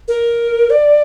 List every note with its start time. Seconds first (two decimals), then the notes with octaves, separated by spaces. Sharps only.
0.08 A#4
0.70 D5